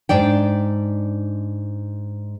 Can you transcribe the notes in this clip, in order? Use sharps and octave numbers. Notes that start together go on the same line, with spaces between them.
G#2 D4 D5 G5